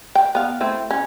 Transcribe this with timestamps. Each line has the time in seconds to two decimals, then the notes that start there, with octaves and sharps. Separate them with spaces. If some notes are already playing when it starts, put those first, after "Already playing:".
0.15 G5
0.35 B3 F5
0.60 A3 C4 E4
0.90 C#4